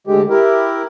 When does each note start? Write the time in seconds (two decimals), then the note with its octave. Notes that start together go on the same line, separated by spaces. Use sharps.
0.07 D2 D3 G#3 G4
0.29 E4 G4 A#4